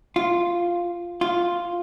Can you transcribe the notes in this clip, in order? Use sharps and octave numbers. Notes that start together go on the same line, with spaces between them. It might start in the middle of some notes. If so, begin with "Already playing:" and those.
F4
F4